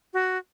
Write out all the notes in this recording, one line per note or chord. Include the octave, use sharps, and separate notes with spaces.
F#4